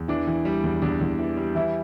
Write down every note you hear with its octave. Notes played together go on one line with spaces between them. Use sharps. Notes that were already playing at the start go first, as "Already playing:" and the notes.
Already playing: E2
E3 D4
E3
G3
E2
E2 D4
E2
E3
G3
E3 E4